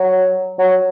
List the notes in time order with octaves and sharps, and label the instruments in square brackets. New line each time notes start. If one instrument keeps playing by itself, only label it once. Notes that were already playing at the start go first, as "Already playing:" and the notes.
Already playing: [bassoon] F#3
F#3